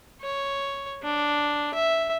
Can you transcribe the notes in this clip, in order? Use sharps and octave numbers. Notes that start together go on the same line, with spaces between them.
C#5
D4
E5